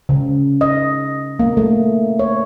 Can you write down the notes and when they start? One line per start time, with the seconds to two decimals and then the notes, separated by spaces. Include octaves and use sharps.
0.09 C#3
0.61 D#5
1.39 A#3
1.57 A3
2.19 C#5